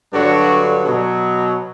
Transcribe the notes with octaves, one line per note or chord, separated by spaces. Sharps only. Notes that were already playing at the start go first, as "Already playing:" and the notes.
G2 D3 F#3 D4 F#4
B2 F#3